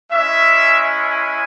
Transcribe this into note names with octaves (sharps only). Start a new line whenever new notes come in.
G#3 C#4 E4 E5
G#5